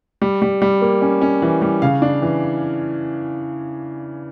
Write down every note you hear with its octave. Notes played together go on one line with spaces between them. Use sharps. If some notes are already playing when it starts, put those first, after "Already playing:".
G3
G3
G3
A#3
C#4
C#4
E3
G3
C#3 F5
D4
E3